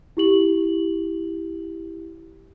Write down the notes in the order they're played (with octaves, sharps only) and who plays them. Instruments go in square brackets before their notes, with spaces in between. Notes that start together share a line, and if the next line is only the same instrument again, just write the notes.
[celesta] E4 G4 F#7